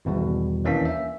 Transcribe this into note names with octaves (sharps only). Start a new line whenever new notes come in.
G#1 E2 B2 G3
D#2 E3 A#3 C#4 D4 B6
E5